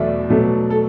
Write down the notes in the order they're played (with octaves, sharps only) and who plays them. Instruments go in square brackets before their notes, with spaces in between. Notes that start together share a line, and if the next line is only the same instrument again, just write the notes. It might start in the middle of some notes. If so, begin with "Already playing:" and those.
Already playing: [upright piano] E2 B2 F#3 A3 D5 E5
B2 F#3 A3
A4